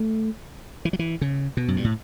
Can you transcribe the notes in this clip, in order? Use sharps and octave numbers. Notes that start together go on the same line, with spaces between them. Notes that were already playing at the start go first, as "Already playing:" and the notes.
Already playing: A3
E3
F#3
E3
C#3
B2
F#2
G2
A2